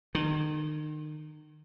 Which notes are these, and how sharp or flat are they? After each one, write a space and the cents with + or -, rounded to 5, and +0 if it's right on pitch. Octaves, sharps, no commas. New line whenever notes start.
D#3 -35